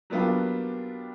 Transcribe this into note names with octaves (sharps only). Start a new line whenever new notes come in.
F#3 G3 A#3 B3 D4 F4